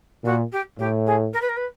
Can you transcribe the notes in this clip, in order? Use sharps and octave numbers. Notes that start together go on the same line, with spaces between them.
A#2 F#4
G4
A2 G4
G#4
A#4
B4
A#4
B4